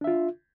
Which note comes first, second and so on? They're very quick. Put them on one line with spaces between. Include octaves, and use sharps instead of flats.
D4 E5 F4